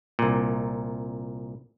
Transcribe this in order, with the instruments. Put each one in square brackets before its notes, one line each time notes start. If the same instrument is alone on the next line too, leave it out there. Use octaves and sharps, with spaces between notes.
[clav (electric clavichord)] C2 A#2